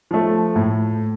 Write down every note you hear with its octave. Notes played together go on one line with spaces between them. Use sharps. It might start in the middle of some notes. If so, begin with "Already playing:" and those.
F3 A3
A2